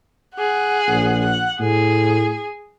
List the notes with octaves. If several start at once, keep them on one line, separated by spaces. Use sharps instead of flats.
G#4 F#5
A#1
F#5
A2 G#4